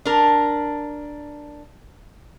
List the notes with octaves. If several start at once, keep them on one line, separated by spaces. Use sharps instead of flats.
D4 A#4